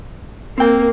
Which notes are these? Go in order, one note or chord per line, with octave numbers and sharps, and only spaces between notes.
A#3 C4 G5